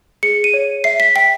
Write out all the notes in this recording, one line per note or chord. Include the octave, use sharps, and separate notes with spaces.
G#4 C#7
D#7
C#5
E5 C7
B6
G5 B6